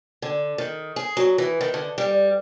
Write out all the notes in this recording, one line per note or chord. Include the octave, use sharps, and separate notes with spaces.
D3
D#3
G#4
F#3
E3
D#3
D3
G3